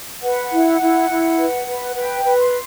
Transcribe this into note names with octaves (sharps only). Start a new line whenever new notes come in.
B4 F#5
E4
E4
E4
B4
B4
B4 G5
B4
C6